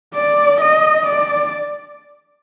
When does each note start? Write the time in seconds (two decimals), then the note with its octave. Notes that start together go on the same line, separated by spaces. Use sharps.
0.14 D5
0.61 D#5
1.06 D5